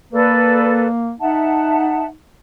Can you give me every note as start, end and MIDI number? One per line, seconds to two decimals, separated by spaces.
0.13 1.11 58
0.13 0.87 69
0.13 0.87 71
0.13 0.87 74
1.20 2.13 63
1.20 2.05 76
1.20 2.05 78
1.20 2.05 81